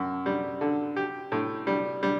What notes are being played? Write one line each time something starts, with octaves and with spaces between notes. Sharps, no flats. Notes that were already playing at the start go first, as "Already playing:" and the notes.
Already playing: F#2
G3
D3
G4
A2
G3
G3